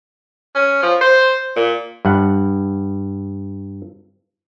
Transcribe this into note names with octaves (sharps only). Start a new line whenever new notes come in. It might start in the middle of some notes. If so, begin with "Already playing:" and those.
C#4
F3
C5
A#2
G2 F#5